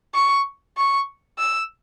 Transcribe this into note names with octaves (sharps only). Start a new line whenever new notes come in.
C#6
C#6
E6